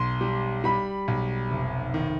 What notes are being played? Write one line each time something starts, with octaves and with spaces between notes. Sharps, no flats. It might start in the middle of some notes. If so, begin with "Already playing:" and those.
Already playing: B1 C6
G3
G3 B5
B1
F1
D#3